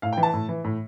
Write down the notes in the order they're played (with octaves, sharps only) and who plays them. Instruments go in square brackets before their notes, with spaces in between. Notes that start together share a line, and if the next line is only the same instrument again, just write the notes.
[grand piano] A2 F5
G5
E3
A5
A2
E3
A2